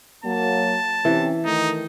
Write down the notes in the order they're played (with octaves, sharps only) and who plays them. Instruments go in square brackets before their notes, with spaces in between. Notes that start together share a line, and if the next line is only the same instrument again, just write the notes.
[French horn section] F#3 A#3 [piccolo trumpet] A5
[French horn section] C3 C#4 [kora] E3
[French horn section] D#3 A3 [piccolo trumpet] D#4